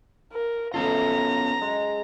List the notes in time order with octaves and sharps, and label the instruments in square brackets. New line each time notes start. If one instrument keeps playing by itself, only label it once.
[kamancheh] A#4
[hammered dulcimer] F#2 A4 [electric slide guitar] B3 C#4 F4 [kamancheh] A#5
[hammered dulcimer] G#3